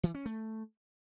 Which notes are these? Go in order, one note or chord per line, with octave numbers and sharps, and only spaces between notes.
E3
C#4
A3